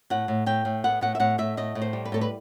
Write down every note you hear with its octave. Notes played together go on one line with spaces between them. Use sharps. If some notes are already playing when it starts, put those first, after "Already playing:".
A2 F#5
A2
A2 G5
A2
B3 F#5
A2 F#5
E5
A2 F#5
A2 E5
A2 D#5
A2
C5
G3
B4
A2 A4
B4